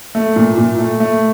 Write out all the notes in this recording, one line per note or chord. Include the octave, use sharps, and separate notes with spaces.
A3
A#2
A#2
A3
A3